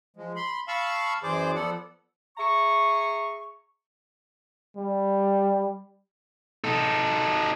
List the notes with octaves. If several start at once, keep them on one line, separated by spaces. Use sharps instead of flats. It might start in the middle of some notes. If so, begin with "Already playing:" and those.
F3 G#3
B5 C6
F5 A5 B5 C#6 E6
F#2 E3 G#4 C5 D5 D6
F3 B3 A4 D5 F#5
G#4 E5 A#5 C#6
G3
D#4 A4